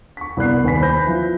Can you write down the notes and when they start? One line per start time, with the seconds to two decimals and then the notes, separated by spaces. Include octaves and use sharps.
0.17 C#6 B6
0.37 C2 B3 D5 F#6 C7
0.64 D#2 B4 G#5 B5 B6
0.81 C5 G#5 B5 G6 A#6
1.07 F3 E4